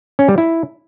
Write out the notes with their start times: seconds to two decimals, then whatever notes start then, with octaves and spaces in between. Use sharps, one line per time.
0.19 C#4
0.28 G3
0.38 E4